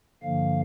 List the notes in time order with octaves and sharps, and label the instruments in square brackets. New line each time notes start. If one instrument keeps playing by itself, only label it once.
[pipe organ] G2 D3 F3 A#3 F5